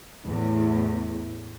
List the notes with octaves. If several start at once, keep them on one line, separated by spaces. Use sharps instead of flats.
E2 A2